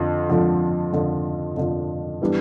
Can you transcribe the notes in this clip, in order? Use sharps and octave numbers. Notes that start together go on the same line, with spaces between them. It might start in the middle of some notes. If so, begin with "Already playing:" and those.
Already playing: F2 D3 F3
F2 D3 F3
F2 D3 F3
F2 D3 F3
E3 G3 B3 D4